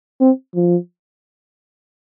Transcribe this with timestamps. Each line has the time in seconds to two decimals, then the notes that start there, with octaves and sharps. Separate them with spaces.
0.21 C4
0.55 F3